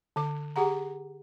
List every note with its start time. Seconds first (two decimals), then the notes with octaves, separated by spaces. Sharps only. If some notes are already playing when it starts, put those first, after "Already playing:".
0.16 D3 D6
0.56 G4 G#4 F#5 A#5